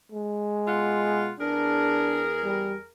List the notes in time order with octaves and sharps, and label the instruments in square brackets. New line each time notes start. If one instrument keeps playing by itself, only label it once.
[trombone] G#3
[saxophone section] B2 F4 F#5
[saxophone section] E2 G#4 A#4 [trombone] D4
[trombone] G3